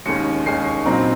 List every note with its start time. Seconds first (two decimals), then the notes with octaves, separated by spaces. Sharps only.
0.06 D#2 D#3 G#3 C#4 C#7
0.46 D#2 D#3 G#3 C#4 C7
0.66 C#6
0.85 A#2 F#3 C4 D#4 A#5